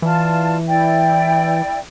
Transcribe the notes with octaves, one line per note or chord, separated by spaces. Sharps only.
E3 F4 D5 A5
E4 D5 G5